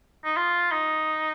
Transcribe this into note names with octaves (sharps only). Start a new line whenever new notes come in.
D#4
F4
D#4